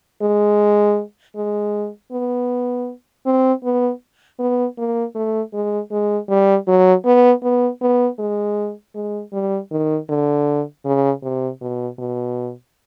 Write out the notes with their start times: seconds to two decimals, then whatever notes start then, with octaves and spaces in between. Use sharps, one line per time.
0.22 G#3
1.36 G#3
2.12 B3
3.26 C4
3.64 B3
4.39 B3
4.78 A#3
5.15 A3
5.54 G#3
5.92 G#3
6.29 G3
6.68 F#3
7.05 B3
7.43 B3
7.81 B3
8.19 G#3
8.95 G#3
9.33 G3
9.71 D#3
10.09 D3
10.85 C#3
11.23 C3
11.61 B2
11.99 B2